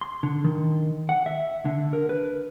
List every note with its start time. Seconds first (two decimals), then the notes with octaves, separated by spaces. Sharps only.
0.01 C6
0.23 D3
0.44 D#3
1.09 F#5
1.26 E5
1.65 D3
1.93 A#4
2.09 B4